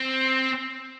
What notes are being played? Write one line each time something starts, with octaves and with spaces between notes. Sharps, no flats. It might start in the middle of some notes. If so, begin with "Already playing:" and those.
Already playing: C4